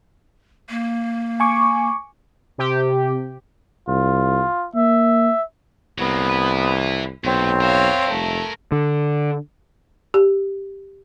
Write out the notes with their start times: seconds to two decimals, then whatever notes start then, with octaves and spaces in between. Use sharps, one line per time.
0.70 A#3
1.40 G#5 C#6 D6
2.58 C3 G4
3.88 C2 F4
4.75 A#3 E5
5.98 C2 F#3 A#3 B3
6.30 E4 B4
7.24 B1 A#2 C4 C#5
7.61 A#4 C#5 E5 F5
8.10 F1 A3
8.72 D3
10.14 G4